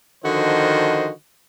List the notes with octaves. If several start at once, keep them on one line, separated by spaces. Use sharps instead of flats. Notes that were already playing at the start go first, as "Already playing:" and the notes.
D3 D#3 F3 F#4 C5 D#5